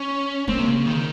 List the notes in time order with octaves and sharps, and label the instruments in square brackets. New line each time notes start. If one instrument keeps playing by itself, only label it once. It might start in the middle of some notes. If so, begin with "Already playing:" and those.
Already playing: [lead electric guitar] C#4
[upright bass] A#3 [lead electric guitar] C4
[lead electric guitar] C3
C#3
D#3